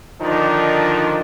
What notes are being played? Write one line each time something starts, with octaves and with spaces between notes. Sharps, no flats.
D3 D#3 F3 D4 D#4